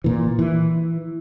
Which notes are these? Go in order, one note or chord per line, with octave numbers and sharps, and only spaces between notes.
A#2 E3
E3